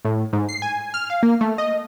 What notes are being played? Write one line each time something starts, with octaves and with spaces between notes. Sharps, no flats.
A2
G#2
C7
G#5
F6
F5
A#3
A3
D#5